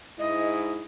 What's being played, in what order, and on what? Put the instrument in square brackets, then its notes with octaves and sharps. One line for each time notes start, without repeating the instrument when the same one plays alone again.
[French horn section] G#2 E4 [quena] D#5